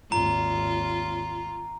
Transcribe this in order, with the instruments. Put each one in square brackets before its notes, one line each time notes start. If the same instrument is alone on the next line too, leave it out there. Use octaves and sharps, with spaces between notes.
[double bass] G#1 D#2 [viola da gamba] F4 [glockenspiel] A#5